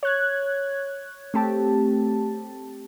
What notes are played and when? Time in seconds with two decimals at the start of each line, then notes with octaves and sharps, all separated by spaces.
0.03 C#5 F#6 G#6
1.34 A3 C4 G4 A5